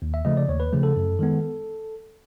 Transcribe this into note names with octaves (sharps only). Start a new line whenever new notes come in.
D#2
E5
C#3 F3 A3 D#5
D5
D#2 C#5
B4
C#3 F3 A3
A4
F#2
D#3 G#3 B3